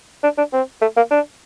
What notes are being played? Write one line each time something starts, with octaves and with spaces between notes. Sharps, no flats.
D4
D4
C4
A3
A#3
D4